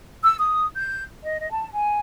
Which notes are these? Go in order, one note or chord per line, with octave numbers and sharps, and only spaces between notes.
E6
D#6
G6
D#5
D#5
A5
G#5